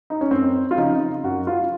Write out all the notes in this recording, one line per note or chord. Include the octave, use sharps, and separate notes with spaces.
D#4
C#4
F#2 C4
F4
C#3 F3 D#4
F#2 F#4
F4